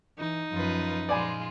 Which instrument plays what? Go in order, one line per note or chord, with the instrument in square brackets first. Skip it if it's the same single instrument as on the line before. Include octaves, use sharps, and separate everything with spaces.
[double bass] E3 [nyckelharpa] D#4
[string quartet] F#2 F4 B4 [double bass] F3
[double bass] A#2 [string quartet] F3 G#3 F4 [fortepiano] D5 G#5 B5